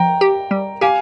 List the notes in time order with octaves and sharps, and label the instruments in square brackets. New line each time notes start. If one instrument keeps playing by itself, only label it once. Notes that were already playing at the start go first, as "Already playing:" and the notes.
Already playing: [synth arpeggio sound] F3 [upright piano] G5 A#5
[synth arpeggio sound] G4
G3
[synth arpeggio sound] G4 [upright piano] F5 G#5